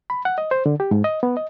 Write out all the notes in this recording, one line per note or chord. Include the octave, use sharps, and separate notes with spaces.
B5
F#5
D#5
C5
D3
G4
G#2
D#5
B3
D#5